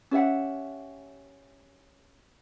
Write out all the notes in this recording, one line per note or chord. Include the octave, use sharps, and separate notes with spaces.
C#4 G4 E5 F#5